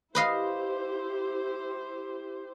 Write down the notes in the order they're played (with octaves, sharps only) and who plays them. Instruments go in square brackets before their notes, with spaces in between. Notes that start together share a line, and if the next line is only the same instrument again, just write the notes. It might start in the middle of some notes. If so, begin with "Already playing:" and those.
[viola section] E4 G4 C5 [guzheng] B4 D#5 F5